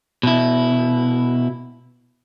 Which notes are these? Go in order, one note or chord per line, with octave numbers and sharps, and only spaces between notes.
B2 E4